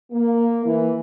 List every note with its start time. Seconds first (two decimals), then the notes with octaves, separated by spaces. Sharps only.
0.12 A#3
0.65 E3